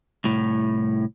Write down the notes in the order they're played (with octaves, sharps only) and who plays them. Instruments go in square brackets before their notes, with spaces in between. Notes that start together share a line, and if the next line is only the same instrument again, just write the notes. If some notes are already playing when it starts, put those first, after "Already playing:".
[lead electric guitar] C2 A2